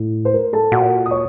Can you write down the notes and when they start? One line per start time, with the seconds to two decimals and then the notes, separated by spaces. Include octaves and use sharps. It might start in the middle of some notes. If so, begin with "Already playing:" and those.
Already playing: A2
0.25 C5
0.34 A#4
0.53 A4 A5
0.72 A#2 F#4 F#5
1.06 D#6
1.11 C#5 C#6